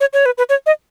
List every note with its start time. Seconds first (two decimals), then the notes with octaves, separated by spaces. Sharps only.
0.01 C#5
0.13 C#5
0.26 B4
0.38 B4
0.49 C#5
0.66 D#5